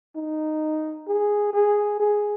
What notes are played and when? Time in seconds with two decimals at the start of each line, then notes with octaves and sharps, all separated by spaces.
0.16 D#4
1.07 G#4
1.54 G#4
2.00 G#4